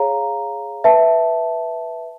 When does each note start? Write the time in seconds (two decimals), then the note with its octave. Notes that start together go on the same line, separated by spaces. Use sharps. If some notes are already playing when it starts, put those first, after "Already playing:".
Already playing: G#4 C#5 F5 A#5
0.84 B4 E5 A5